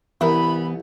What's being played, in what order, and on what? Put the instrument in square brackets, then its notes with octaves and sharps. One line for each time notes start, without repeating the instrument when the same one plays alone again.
[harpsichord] C2 [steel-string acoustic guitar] E3 B3 [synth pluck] E4 A#4 [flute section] B5